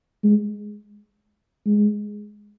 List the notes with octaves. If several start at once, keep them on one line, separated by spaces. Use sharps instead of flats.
G#3
G#3